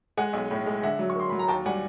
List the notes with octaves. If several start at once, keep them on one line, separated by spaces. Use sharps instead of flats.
G#3 F#5 G#5
B1
A2
G#3
D3 E5 F#5
F#3
C#6
A#3 C6
F#3 B5
A#5
D#2 G5 A5
G3 F#5 G#5